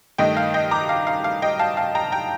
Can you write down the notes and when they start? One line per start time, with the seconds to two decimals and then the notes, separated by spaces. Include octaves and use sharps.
0.18 G2 D#3 A3 D#5 G5
0.37 F5
0.54 D#5 G5
0.71 A#5 D6
0.89 F5
1.07 F5
1.24 F5
1.42 D#5 G5
1.59 F5 A5
1.77 F5 A5
1.95 G5 A#5
2.12 G5 A#5